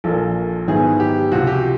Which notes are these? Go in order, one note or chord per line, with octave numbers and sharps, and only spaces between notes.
A#1 A#2 F3 A#3 A4
G#2 D#3 F#3 B3 E4 G#4
G4
C#2 C3 F3 F#4
G4